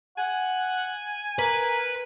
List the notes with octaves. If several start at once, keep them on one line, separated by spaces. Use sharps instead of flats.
F#5 G#5
A#4 B4